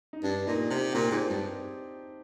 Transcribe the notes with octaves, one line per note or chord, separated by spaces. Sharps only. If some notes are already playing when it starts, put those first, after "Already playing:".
D#4
G2 D4
A#2 D#4
C3 G4
A#2 G4
G#2
C4
G2